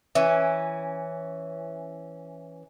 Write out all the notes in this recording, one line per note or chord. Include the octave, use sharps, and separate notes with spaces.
E3 C#4